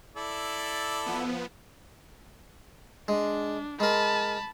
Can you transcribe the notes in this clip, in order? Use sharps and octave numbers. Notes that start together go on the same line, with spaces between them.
E4 A4 D5
F3 B3
G#3 D4
G#3 A#4 A5 B5